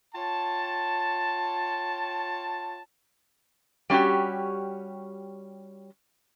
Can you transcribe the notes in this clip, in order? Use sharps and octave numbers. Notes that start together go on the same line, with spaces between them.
F4 C#5 G5 A5
G3 C#4 D#4 F#4 G4